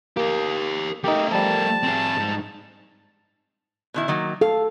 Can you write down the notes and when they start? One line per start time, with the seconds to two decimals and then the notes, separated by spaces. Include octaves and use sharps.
0.17 A#3 G4 A#4
1.04 A3 D#4 G4 A#4
1.31 F3 G3 A5
1.84 C4 G#4
2.19 G#2
3.94 B2 D#3 E4
4.08 D#3 F#3 A#3
4.41 A4 F5